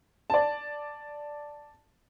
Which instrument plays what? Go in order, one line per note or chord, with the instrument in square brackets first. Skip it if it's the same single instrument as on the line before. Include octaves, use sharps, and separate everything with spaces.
[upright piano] D5 A5